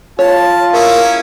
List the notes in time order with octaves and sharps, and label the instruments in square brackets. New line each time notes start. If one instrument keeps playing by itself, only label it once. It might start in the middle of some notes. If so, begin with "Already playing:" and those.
[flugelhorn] F4 [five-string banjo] C#5 [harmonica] A5
[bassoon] A#3 [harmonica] C#4 E4 G#4